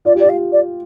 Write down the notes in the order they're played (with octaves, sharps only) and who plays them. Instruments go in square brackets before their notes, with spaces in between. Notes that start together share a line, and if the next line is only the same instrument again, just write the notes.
[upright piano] F4 [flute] D5
[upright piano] G4
[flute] D5
[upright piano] F4 [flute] F5
[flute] D5